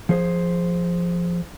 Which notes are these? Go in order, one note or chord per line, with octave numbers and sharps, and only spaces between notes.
F3 G#4 C5